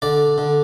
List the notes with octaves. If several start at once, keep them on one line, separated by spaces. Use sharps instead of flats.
D3 D5
D3